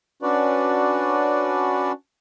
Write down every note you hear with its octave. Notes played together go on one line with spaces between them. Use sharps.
C#4 D4 F#4 B4 D5